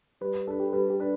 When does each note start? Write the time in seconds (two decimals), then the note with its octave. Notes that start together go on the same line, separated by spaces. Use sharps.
0.21 G3 B4
0.47 D4 A4 B4
0.60 G4
0.73 G3 B4
0.90 G4
1.00 D4 B4